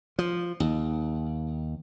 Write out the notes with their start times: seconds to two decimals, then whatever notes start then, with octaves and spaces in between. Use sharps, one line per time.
0.19 F3
0.60 D#2